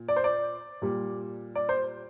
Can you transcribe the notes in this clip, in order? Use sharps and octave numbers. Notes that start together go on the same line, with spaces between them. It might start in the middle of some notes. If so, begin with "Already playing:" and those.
Already playing: A#2
D5
C5
D5
A#2 G3
D5
C5